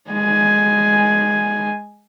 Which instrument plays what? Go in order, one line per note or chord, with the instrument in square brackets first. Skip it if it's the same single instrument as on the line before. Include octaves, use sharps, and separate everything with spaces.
[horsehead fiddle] G#3 G#5